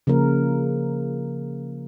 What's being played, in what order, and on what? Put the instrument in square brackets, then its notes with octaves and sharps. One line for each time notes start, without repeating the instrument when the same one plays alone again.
[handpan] C#3 F3 A#3 A#4